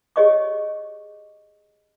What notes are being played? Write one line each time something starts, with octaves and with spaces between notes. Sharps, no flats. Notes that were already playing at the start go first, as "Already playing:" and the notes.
G4 G#4 C#5 D#5 C#6 D6